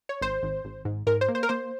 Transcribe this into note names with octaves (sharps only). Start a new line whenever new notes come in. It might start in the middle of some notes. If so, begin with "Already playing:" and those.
C#5
G#1 C5
G#1
G#1
G#2
G#2 A#4
C5
A#3
C5
A#4
A#3 C5